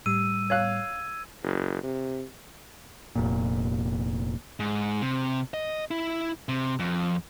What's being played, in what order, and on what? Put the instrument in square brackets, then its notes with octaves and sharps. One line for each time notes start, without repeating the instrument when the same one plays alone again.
[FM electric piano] A2 G3 [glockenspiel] E6 D#7
[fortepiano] C#5 F5 F#6 [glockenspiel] G#6
[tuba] F#1
C3
[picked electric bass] F1 A#2
[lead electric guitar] G#2
C3
D#5
E4
C3
F2